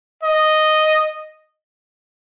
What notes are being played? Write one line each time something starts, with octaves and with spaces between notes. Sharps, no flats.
D#5